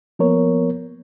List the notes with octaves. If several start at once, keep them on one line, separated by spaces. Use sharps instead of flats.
F3 A#3 B3 A#4 C#5